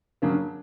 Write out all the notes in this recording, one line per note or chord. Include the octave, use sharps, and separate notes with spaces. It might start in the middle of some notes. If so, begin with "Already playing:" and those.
C#3 F#3 A#3 D4